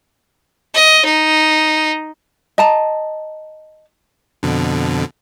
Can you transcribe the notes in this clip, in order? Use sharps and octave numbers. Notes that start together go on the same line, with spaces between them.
D#5
D#4
D#5 A5 A#5
F2 B2 D3